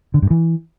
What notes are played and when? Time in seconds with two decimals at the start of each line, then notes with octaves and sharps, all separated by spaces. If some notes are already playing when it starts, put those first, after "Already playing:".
0.14 D3
0.22 G2
0.31 E3